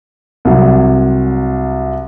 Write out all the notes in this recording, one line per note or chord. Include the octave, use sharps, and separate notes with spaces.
C2 F#3